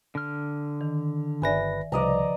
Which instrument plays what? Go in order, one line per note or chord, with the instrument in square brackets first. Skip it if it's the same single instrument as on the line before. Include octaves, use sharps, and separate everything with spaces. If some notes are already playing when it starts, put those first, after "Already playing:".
[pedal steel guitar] D3 F6
[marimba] D#3
[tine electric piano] G1 B4 A#6 [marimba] D5 E5 G#5
[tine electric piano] C2 [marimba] C#3 F3 B4 [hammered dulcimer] D5 D#5 A#5